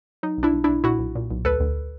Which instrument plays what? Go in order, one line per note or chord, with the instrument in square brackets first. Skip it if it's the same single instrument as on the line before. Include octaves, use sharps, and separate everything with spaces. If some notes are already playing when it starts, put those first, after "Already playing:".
[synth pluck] F#3 D#4
B1
D4 E4
B1
B1 D4 E4
A#2 E4 F#4
B1
A#2
B1
D2 A4 B4
D2